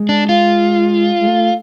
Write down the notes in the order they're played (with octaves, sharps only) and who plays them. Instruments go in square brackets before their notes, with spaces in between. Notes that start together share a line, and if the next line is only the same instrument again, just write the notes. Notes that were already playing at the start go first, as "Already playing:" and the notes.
Already playing: [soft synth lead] G#3
[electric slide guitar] D4
F4
[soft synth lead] G#3
A3